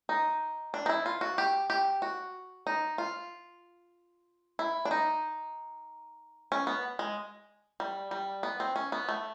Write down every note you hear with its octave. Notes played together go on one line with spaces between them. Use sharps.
D#4
D4
D#4
E4
F4
F#4
G4
G4
F#4
D#4
F4
E4
D4
D#4
C#4
B3
G#3
G3
G3
B3
C4
C#4
B3
A3